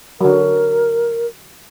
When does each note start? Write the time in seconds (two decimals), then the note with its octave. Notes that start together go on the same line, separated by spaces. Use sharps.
0.21 D3 F#3 A#4